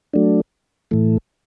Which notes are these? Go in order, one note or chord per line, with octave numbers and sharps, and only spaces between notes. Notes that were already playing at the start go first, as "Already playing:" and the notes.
F#3 A3 D4
A2 E3 A3